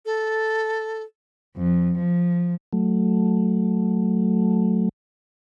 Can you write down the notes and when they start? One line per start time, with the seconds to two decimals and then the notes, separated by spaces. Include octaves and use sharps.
0.06 A4
1.57 F2
1.99 F3
2.73 F#3 A3